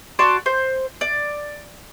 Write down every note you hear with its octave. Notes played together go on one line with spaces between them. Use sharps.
F#4 D5 A5 C6
C5
D5